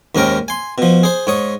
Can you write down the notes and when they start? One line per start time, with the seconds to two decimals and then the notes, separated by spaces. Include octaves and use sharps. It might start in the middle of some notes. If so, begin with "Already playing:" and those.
0.15 D#2 G#2 C#4 A#4 G5
0.48 G#5 C6
0.78 B2 F3
1.03 G#4 C5
1.27 G#2 C#5 D#6